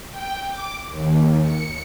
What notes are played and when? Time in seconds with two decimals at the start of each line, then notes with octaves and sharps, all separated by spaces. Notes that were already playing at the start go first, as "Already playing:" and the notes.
0.12 G5
0.49 D6
0.89 D#2
1.42 C#7